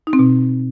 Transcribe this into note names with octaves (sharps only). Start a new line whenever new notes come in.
D#4
C4
B2